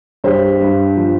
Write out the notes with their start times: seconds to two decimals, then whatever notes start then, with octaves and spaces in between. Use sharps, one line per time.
0.24 G2 G4 C5
0.61 G2
0.96 F3